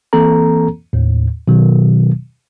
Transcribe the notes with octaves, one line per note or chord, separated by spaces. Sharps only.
E3 A#3 C4 A4 A#5
D#2 A2
B2 D#3 F#3